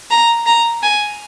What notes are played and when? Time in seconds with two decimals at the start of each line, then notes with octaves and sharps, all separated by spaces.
0.10 A#5
0.46 A#5
0.83 G#5